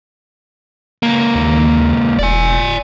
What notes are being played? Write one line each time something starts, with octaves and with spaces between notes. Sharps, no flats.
C#2 A#3
D#2
E1 D5 G#5